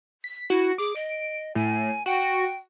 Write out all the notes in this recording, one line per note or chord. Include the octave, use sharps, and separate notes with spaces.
B6
E4 F#4
G#4 D6
D#5 D7
A2 G#5
F#4 G5